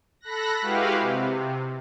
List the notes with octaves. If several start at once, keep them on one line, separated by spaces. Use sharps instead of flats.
A4 B5 F#6 A#6
G#3 E4 F#4 G4 B4 F5
C3